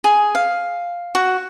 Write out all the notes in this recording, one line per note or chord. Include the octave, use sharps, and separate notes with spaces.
G#4
F5
F#4